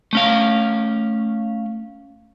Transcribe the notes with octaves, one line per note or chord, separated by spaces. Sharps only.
A3 C#4 F5